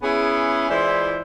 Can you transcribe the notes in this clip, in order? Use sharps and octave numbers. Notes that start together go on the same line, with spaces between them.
B3 C#4 E4 G#4
E3 G#3 E4 F4 C5 D5